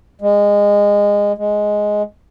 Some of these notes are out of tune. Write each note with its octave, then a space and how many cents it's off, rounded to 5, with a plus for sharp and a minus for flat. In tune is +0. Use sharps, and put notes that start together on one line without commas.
G#3 -20
G#3 +5